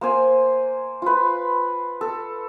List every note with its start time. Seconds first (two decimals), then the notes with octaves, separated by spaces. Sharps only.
0.01 A#3 C5 G#5
1.02 F4 B4
2.01 A4